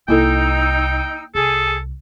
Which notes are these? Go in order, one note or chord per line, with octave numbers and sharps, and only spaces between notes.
C2 A#3 D#4 E4 A4 G5 E6
C2 G#4 A4